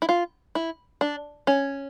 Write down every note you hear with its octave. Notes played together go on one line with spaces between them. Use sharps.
E4
F4
E4
D4
C#4